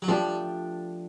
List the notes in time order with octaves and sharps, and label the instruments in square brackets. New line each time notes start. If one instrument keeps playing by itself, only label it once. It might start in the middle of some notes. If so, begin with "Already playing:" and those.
[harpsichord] F#3
[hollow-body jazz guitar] F3 A3 D4 G4 [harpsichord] G3